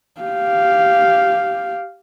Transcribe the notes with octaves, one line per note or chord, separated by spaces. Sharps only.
G4 F5